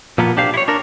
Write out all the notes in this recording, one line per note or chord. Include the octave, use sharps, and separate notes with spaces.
A#2 F3 A#3 B3
B1 D4 G4 C5 F5
E4 C#5
D4 A#4